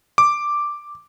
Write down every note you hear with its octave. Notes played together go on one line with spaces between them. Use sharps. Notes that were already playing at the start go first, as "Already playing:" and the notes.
D6